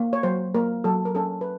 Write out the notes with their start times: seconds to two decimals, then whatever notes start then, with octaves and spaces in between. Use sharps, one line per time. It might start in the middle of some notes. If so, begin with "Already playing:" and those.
Already playing: A#3
0.13 C#5
0.23 F#3 C5
0.55 A#3 A#4
0.84 F#3 A4
1.05 A#4
1.15 C#4 A4
1.41 B4